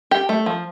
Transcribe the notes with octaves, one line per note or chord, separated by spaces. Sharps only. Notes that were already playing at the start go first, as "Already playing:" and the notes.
G4
A3
F3